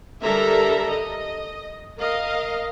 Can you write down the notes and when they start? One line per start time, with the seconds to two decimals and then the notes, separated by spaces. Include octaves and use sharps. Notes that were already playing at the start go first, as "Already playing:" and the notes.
0.23 D3 G3 A4 A#4 E5 A#5
0.91 D#5
1.98 A#4 D#5 F5